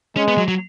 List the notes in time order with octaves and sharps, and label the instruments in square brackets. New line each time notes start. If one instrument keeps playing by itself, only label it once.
[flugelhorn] G#3 [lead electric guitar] C#4
[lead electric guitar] B3
F#3
F#3